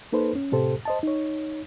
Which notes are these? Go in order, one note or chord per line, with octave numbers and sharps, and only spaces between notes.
A#3 D#4 A4 B4 C5
C#4
A2 C3 G4 A4 C5
C5 D#5 A5
D#4 C#5